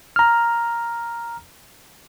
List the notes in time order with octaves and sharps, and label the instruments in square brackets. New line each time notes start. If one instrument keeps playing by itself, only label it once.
[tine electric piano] A#5 F6